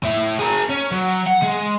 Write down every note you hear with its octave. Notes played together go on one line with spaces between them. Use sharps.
A2 E4
G#4 A#4
C#4
F#3
F#5
G#3